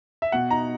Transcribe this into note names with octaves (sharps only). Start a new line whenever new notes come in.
E5
B2 F#5
D#4 A#5